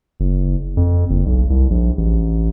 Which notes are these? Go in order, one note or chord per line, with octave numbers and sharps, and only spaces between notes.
F#1
F2
F#1
B1
C2
A#1
A1